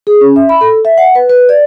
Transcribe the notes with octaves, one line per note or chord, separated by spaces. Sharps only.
G#4
C#4
E5
B5
A4
E5
F#5
B4
B4
D5